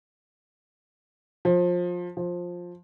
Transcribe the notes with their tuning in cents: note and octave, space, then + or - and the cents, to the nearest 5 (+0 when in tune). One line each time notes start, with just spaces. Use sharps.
F3 +25
F3 +15